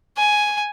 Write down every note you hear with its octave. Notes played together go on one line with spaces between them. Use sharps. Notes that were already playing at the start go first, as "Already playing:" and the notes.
G#5